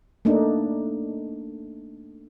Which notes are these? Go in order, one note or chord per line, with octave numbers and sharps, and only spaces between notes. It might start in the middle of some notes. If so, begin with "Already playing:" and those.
A3 A#3 D4 D#4